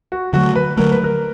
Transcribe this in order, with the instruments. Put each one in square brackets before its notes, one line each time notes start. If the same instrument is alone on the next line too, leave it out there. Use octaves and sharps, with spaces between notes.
[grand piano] F#4
[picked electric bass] D3 F#3 A3 [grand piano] F#4
[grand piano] B4
[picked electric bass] D3 F#3 A3 [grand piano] A#4
[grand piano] B4
A#4